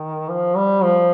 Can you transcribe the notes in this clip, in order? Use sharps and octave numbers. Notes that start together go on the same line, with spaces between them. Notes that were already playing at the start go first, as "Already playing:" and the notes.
Already playing: D#3
F3
G3
F3